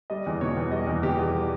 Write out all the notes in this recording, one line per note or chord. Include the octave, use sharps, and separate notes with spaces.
G3 D#5
E2
B2 C#5
E2
G3 D#5
E2
B2 G4
E2
G3